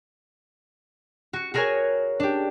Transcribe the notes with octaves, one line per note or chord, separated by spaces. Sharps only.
F#4 C#7
F#4 G#4 A#4 C#5 G#5
D4 G4